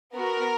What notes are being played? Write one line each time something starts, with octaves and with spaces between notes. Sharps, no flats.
B3 F#4 A#4